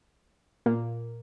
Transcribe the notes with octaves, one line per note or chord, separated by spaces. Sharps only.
A#2 A#3